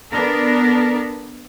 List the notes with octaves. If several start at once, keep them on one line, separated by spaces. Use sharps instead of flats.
B3 D4 A4 A#4